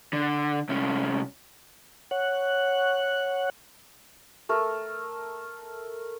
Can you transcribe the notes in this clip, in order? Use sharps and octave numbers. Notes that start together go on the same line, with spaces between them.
D3
C2 C#4
C#5 F#5 F#6
A3 A#4